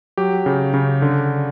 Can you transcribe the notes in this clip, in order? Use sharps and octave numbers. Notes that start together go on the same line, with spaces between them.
F#3 G4
C#3
C#3
D3